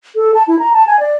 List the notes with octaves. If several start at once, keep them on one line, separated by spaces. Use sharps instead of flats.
A4
A5
E4
A#5
A5
G#5
D5